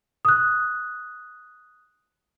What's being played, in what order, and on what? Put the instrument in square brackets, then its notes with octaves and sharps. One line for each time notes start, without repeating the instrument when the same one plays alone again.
[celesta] D#6 F#6